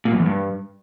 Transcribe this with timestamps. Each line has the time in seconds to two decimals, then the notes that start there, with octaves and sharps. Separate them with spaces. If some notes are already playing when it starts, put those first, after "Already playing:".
0.05 A#2
0.12 F#2
0.19 E2
0.26 G2